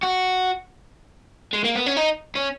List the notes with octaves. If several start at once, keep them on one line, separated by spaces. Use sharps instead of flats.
F#4
G#3
A#3
B3
C#4
D#4
C#4